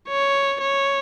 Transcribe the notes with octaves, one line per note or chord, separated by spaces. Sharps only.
C#5
C#5